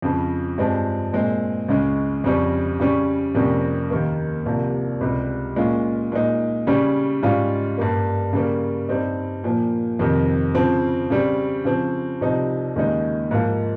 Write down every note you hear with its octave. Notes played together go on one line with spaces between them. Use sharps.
F2 C#3 F3
G2 F3 G#3 C4
A#2 G#3 C4
C#2 C#3 G#3 C#4
F2 C#3 G3 C#4
C#3 G3 C#4
F2 C3 G3 A#3 C#4
D#2 D#3 A#3
C2 C3 F3 A#3
C#2 C3 G3
A#2 G#3 C#4 F4
A#2 G#3 D#4
C#3 G3 C#4
G#2 G3 C#4 F4
G2 G3 A#3
C#3 G3 A#3
G2 G3 C4 D#4
A#2 F3 A#3
F2 C3 D#3
C#3 F3 C4
C#3 G3 C4
C#3 F3 C4
C2 C3 F3 C4 D#4
D#2 C#3 G#3 D#4
G#2 F3 A#3 F4